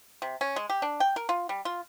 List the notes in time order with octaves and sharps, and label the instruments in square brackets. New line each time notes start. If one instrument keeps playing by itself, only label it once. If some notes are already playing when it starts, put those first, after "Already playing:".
[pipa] C3
C#4
G#3
G4
D4
G5
A#4
F4
G3
F4